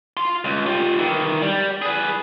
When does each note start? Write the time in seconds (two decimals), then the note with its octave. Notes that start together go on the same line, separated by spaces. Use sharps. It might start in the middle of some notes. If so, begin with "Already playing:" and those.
0.17 F5 C6
0.45 C#2
0.66 F4 G4
0.99 D#3 E3
1.42 G3
1.82 G#4 B4